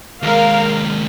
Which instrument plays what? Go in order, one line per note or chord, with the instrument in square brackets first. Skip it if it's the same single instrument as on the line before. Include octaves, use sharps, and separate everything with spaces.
[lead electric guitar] D#2 G#3 [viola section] A#4 F5